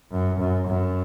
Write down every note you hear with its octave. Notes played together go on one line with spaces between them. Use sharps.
F#2
F#2
F#2